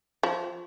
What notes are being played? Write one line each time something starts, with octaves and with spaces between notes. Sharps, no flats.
F3